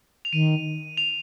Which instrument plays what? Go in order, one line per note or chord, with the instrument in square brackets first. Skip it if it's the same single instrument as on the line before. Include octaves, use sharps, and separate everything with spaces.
[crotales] F7
[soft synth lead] D#3 [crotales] D#7
[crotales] F7